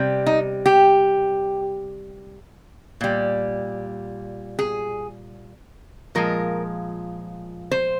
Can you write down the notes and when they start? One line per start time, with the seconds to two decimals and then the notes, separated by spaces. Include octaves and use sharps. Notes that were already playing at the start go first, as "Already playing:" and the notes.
Already playing: C3 G3
0.26 D#4
0.66 G4
3.01 A#2 G3
4.59 G#4
6.15 A#2 F3 G#3 A#4
7.71 C5